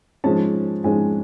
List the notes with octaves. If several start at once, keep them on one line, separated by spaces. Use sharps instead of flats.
G#2 F3 G#3 C#4 A5
G#2 F3 G#3 C#4 G#5